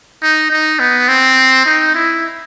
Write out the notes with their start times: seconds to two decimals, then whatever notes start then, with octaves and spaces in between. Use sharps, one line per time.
0.22 D#4
0.51 D#4
0.80 B3
1.08 C4
1.66 D#4
1.94 E4